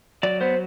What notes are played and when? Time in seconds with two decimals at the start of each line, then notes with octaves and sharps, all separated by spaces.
0.23 F#3 D5
0.41 B3 C5